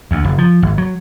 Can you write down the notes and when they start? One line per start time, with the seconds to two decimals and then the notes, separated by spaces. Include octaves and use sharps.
0.11 D2
0.25 F#1
0.38 F3
0.62 G#1
0.78 F#3